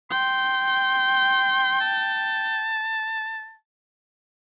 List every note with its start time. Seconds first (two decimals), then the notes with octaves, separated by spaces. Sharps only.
0.11 G5 C6
1.81 A5